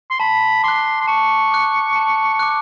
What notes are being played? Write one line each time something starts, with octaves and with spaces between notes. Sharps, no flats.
C6
A5 B5
C6 D6 F#6
C6
A5 C#6
D6 F#6
A5
D6 F#6